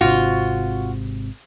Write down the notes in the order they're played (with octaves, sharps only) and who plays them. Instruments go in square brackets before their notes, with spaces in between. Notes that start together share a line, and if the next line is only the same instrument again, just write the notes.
[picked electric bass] G#1 C3 [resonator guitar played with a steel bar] F4 F#4